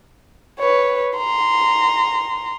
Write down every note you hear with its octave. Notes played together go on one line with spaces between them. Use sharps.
B4 C#5
A#5 C6